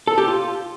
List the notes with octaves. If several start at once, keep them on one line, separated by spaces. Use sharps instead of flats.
A4
G4
F4